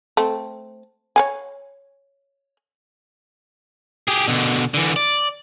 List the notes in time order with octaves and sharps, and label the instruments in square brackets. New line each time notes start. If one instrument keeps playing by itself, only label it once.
[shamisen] A3 C4
C#5 F5 G#5
[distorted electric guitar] G4 G#4
B2 D3
D3 E3
D5